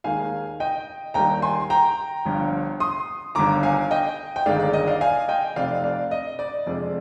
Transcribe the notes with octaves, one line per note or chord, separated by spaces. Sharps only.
D#2 D#3 G#3 F5 G#5
D#5 G5
D#2 D#3 G3 G5 A#5
G#5 C6
G5 A#5
G1 G2 F3
C6 D#6
G1 G2 D#3 A#5 D6
F5 G#5
D#5 G5
G5
G1 G2 D#3 G#3 D5 F5
D5
D#5
D5 F5
F5 G#5
D#5 G5
F1 F2 C3 D5 F5
D5 F5
D#5
D5
F2 C3 F3 G#3 D5